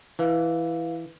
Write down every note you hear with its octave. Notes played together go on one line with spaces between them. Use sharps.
E3 E4 B4 F5